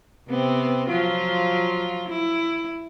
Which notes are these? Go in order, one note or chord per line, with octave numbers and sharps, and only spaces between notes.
C3 B3 C4
F3 F#3 F4
E4